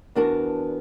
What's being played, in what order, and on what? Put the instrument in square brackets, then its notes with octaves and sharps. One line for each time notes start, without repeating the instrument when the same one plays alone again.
[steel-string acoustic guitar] E2 B3 D4 F#4 A#4 A5